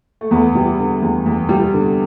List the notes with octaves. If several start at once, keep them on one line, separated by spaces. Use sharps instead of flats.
A3
E2 B3
G3
D3
E2
E2
G3
D3